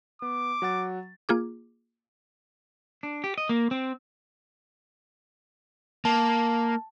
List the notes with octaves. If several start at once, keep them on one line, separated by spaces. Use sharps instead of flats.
B3 D6
F#3 F#5 A6
A#3 F4 G#4 D6
D4
G4
D#5
A#3
C4
A#3 A5